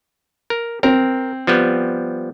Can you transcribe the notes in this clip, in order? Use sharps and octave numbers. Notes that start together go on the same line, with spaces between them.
A#4
C4 A#4
F3 G3 B3